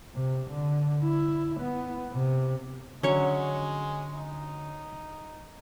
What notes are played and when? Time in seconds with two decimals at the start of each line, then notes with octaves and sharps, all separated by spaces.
0.15 C3
0.50 D3
1.03 E4
1.60 B3
2.12 C3
3.03 D3 F#3 G#3 C#4 C#5
4.16 D#4